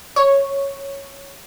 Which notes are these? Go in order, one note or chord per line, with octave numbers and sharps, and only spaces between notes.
C#5